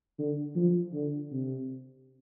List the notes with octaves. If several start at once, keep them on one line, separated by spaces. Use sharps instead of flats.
D3
F3
D3
C3